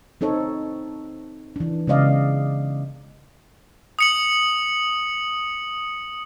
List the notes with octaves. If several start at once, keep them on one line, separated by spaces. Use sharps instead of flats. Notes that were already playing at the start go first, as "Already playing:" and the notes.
C4 D#4 A4 C#5
E3 D4
C#3 G#3 B3 D5 D#5 F5
D#6 C#7 F#7